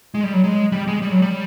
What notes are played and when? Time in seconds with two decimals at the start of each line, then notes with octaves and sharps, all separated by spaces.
0.14 G#3
0.23 G3
0.33 F#3
0.44 G#3
0.72 G3
0.87 G#3
1.02 G3
1.11 F#3
1.22 G3